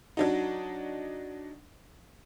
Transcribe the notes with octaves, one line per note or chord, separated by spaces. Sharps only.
F#3 D4 D#4